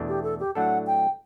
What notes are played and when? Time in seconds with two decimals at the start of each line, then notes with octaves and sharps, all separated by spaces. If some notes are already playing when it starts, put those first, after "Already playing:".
Already playing: E2 B2 A3 D4
0.08 G4
0.23 A4
0.40 G4
0.55 A2 F#3 A3 D4 A4 F#5
0.87 G5